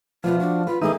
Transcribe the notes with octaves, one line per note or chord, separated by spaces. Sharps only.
E2 B2 F3 B3 F4
D4 F#4
F4 B4
E3 A3 A#3 D#4 G#4 D#5